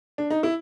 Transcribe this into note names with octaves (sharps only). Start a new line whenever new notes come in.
D4
D#4
E4